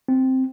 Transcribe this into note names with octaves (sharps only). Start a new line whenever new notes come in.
C4